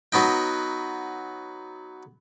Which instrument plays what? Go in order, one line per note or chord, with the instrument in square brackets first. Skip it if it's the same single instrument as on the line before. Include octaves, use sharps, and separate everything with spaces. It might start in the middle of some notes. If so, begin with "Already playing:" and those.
[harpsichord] F#3 B3 D#4 G5